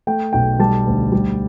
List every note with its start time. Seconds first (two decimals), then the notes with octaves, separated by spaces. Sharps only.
0.07 A3 G5
0.33 B1 G5
0.59 G3 A5
0.87 D2
1.12 G3